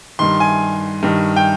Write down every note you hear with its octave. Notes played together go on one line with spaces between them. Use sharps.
G2 D#3 C6
G#5
G2 D#3
G5